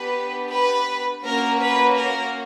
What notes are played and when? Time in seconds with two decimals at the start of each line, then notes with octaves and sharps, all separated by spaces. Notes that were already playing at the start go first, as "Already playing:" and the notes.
Already playing: B3 D4 G4 B4
0.53 B4
1.25 A#3 C#4 F#4 A#4
1.61 B4
1.98 A#4